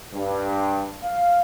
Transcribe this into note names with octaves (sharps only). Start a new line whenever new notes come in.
G2
F5